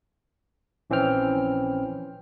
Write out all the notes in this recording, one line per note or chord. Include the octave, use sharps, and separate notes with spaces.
A#1 E3 C4 C#4 G5 F6